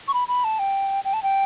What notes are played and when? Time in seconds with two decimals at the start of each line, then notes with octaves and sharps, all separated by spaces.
0.08 C#6
0.14 B5
0.28 B5
0.44 A5
0.59 G5
1.05 G5
1.14 A5
1.23 G5